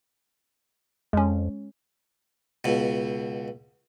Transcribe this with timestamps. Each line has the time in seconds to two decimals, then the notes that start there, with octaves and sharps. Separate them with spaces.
1.13 F2 G#3 C#4
2.64 C#2 B2